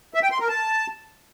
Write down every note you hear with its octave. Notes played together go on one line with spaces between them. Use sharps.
E5
G5
C6
A#4
A5